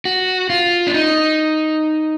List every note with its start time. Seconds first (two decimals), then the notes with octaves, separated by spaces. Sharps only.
0.05 F#4
0.50 F4
0.87 D4
0.94 D#4